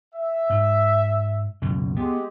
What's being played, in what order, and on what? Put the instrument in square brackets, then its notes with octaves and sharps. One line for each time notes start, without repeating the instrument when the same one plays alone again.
[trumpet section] E5
[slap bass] G#2
C#2 F#2 B2
[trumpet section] G#3 G4 [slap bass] B3